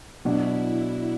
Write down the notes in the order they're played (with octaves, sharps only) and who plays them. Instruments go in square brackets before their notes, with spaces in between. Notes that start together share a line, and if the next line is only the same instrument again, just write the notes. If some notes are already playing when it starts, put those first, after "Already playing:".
[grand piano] B2 F#3 D4 F#4 [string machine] E4